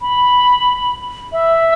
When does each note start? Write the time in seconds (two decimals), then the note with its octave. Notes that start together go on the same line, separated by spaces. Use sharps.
0.01 B5
1.32 E5